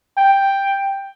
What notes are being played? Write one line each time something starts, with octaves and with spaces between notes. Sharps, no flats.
G5